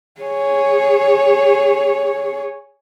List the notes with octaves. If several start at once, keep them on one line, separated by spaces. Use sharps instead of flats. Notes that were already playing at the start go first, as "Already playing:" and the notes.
G#4 C#5